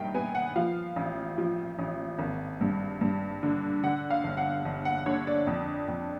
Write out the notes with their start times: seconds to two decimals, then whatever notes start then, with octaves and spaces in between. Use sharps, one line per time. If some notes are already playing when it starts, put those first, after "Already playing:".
Already playing: G2 D#3 E5 G5
0.14 B3 G#5
0.35 F#5
0.56 F3 F5
0.96 A1
1.38 F3
1.79 A1
2.19 G#1
2.61 G2
3.01 G2
3.43 D3
3.83 D3 F#5
4.10 F5
4.24 G1
4.37 F#5
4.65 G1
4.85 F#5
5.06 D3 C#5
5.27 D5
5.47 F2
5.88 F2